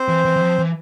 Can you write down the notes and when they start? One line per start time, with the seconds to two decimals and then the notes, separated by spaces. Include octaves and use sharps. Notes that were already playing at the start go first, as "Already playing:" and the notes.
Already playing: C4 C5
0.08 E3
0.25 E3
0.36 E3
0.41 F3
0.59 E3